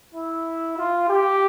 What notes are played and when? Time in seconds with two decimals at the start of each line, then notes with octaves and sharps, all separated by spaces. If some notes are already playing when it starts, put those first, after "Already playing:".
0.13 E4
0.77 F4
1.09 G4